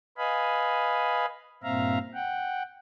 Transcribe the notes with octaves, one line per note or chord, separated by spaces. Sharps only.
B4 D#5 F5 G#5 B5
G2 A#2 C4 E5 F5 A#5
F#5 G5